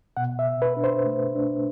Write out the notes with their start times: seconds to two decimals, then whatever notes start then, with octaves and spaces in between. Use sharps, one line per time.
0.17 B2 F#5
0.39 E5
0.47 B2
0.62 B4
0.77 D4
0.84 C5
1.06 A3
1.35 D4